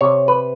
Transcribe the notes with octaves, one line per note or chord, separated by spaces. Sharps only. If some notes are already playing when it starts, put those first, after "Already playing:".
C3 C#5
B4